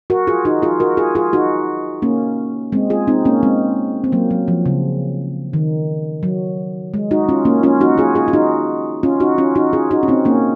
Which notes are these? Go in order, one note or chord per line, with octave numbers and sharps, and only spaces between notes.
F#4 A#4
F4 G#4
D#4 F#4
F4 G#4
F#4 A#4
F4 G#4
F4 G#4
D#4 F#4
A#3 C#4
G#3 C4
F4 G#4
C4 D#4
A#3 C#4
G#3 C4
C4
F#3 A#3
F#3
F3
C#3
D#3
F#3
G#3
D#4 F#4
C#4 F4
A#3 C#4
C#4 F4
D#4 F#4
F4 G#4
F4 G#4
F4
D#4 F#4
C#4 F4
D#4 F#4
C#4 F4
D#4 F#4
F4 G#4
D#4 F#4
C#4
C4 D#4
A#3 C#4